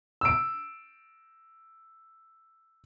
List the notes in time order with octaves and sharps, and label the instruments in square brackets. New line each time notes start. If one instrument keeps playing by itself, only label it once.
[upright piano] E6 D7